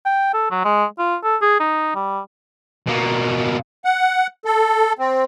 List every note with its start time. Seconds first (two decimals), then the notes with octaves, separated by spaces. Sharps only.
0.05 G5
0.34 A4
0.51 F#3
0.64 G#3
0.99 F4
1.24 A4
1.42 G#4
1.60 D#4
1.95 G3
2.87 B2 A#3
3.85 F#5
4.45 A4
4.99 C4